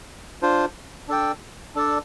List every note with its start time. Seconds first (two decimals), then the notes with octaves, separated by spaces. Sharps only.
0.42 D4 F4 C5
1.08 D4 A4 D5 G5
1.75 D4 A4 D5